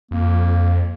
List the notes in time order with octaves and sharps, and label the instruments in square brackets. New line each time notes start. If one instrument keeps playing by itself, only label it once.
[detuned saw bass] F2 [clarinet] A#3